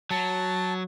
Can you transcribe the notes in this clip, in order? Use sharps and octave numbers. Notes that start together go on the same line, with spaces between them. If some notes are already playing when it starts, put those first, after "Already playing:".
F#3 A5